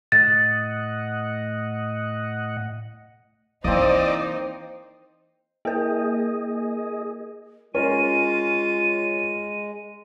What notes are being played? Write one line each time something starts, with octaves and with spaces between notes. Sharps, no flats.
A2 D#5 F#5 A6
E3 A#3 C4 D#4 E4 C5 D5 D#5
A#3 G#4 A#4 D#5
G#3 C#4 F4 A#4 C#5 D#7